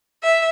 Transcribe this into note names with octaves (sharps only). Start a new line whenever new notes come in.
E5